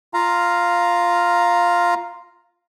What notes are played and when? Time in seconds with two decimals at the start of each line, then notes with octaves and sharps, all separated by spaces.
0.14 F4 F5 A#5